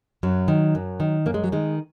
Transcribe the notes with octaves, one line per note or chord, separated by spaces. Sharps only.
F#2 F#3
D#3
F#2
D#3
F#2 A#3
G#3
F#3
D#3 G#3